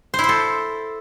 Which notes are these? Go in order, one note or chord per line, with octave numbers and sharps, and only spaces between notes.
C5
E4
C5
A4